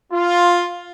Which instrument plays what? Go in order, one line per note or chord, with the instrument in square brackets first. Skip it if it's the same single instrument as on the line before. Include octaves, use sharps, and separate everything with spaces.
[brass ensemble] F4